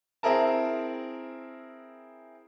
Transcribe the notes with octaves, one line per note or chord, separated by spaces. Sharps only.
C4 E4 G#4 A#4 A5